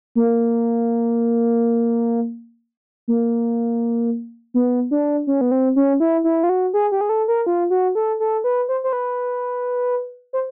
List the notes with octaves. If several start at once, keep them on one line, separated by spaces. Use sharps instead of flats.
A#3
A#3
B3
D4
C#4
B3
C4
C#4
E4
E4
F4
F#4
G#4
G4
G#4
A4
A#4
F4
F#4
A4
A4
B4
C5
C5
B4
C5